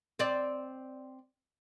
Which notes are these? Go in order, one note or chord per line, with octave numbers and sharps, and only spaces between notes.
C4 D5